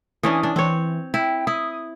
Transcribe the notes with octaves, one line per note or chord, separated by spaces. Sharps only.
E3 C#4 D4 D#6
D4
E3 C4 C#5
E4 G5
E4 D#6